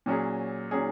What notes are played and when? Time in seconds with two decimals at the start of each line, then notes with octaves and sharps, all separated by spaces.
0.06 A#2 F#3 C#4 G#4
0.71 A#2 F#3 C#4 G#4